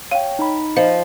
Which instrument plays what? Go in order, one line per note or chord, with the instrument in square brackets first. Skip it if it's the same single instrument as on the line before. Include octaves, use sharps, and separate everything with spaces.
[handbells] C#5 G5 [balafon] F5
[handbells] D#4 B5
[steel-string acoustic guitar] F3 [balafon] D#5